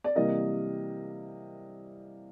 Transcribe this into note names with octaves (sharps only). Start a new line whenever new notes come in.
D5
C3 E3 G3 A#3 D#5